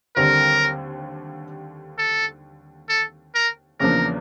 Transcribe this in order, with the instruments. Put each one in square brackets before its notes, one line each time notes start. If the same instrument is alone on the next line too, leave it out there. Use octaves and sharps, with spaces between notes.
[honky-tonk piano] D#2 D3 G3 C4 [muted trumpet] A#4
[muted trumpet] A4
A4
A#4
[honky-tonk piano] E2 C#3 F3 A#3 D4 [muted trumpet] A#4